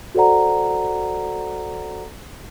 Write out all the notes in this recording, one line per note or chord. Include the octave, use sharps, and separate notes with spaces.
F#4 A4 C5 D5 F#5 A#5